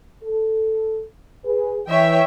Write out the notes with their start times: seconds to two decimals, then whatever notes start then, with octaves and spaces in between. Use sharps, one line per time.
0.24 A4
1.46 G#4 B4
1.88 E3 C#5 E5 G5